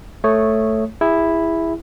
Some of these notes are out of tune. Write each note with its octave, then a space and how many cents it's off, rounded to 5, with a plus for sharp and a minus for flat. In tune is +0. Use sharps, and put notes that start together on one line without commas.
A3 +0 C#5 -5 D#6 +0
E4 +0 G#4 -30